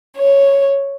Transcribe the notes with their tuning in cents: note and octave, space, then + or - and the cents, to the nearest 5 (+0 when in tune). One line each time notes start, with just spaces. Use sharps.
C#5 +0